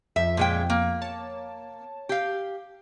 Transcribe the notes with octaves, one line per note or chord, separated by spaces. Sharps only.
F2 F3 E5
A#2 G#3 G5
A#3
C#5 A5
G4 F5